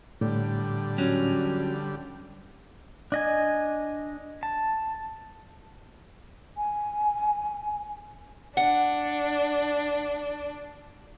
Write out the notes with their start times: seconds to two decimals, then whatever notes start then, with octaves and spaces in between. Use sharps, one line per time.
0.21 A2 D3 G3
0.98 F#3 C#4
3.12 D4 D#5 G#5
4.43 A5
6.57 G#5
8.57 D4 F#5